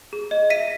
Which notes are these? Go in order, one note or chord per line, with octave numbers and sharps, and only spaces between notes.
G#4
D#5
E5 B6 D#7